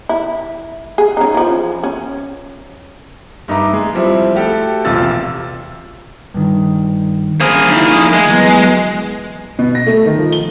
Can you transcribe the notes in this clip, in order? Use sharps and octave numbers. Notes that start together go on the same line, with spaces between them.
E4
G#4
C#4 D#4
E3 F3
C#4
G2 D#4 E5 A#5 D6
G#3
F3 G3 C4 E4
A3 F#4 G4 A4
E1 A#1 C3 F4 E6 A6
G2 D#3
A#3 G#4 C5
F3 D#4 E4
G#3
E3 F#3 B3
B2
A#6
A3
D#3
F3
G7